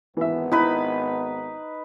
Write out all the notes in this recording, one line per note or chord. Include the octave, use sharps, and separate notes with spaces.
G#1 E3 B3 E5
D#4 E4 B4 B5